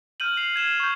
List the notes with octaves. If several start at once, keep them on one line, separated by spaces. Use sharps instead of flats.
F6 G6 D#7 F#7
C7 F7
G#6 E7 G7
C#6 G6